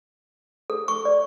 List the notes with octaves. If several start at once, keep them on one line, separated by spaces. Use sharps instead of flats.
A4
C#6
D5